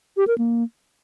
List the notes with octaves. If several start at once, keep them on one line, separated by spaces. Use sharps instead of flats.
G4
A#4
A#3